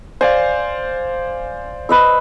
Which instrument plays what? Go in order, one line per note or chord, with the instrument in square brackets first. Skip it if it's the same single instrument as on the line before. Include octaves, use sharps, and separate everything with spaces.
[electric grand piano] C5 D5 F5 [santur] G#5
[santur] B4 D#5 E6